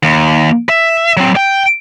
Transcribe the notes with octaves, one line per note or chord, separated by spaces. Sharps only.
D#2
E5
F#3 C4
G5